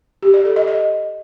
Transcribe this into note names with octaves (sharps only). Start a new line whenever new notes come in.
G4
D5
A4
D#5
D#5